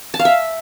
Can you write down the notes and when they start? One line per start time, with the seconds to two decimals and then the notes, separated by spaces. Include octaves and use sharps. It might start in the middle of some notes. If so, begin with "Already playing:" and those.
0.14 A5
0.19 F5
0.25 E5